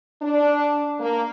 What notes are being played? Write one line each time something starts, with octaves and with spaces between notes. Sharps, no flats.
D4
A#3